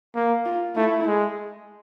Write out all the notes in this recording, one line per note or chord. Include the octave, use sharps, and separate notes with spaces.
A#3
F4
A3 E4
G#3